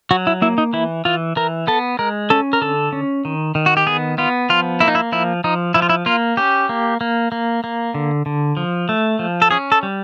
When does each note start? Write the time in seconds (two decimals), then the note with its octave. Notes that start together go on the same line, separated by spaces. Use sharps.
0.11 F#3 F#4
0.27 E4
0.42 A#3 E4
0.58 D#4
0.73 E3 E4
1.05 E3 F4
1.36 E3 A#4
1.67 B3 A4
1.99 G#3 A#4
2.30 C#4 A4
2.53 A#4
2.62 D3 A4
2.93 C#4
3.25 D#3
3.55 D#3
3.66 F#4
3.77 G4
3.87 B3 G#4
4.18 B3 F4
4.49 F3 F4
4.80 A#3 E4
4.88 D#4
4.95 E4
5.12 F3 E4
5.44 F3 D#4
5.74 F3 E4
5.82 F4
5.89 E4
6.06 A#3 F4
6.37 C#4 G4
6.69 A#3
7.01 A#3
7.32 A#3
7.64 A#3
7.94 D3
8.26 D3
8.57 F3
8.89 A3
9.19 F3
9.42 A4
9.51 C#4 G#4
9.72 A4
9.83 G3